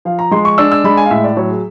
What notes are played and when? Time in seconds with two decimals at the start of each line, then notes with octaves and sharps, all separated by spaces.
0.05 F3 F5
0.19 A#5
0.31 G#3 C6
0.45 C#6
0.58 D4 E6
0.72 E6
0.84 G#3 B5
0.97 G#5
1.05 F5
1.11 A2 E5
1.24 D5
1.37 F#3 C#5
1.50 G#4